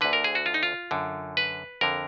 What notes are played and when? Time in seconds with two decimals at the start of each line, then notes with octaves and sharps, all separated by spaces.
0.01 D2 D3 B4
0.13 A#4
0.24 G#4
0.35 F#4
0.46 F4
0.54 D#4
0.63 F4
0.91 F#2 D3
1.37 B4
1.81 F2 D3 A#4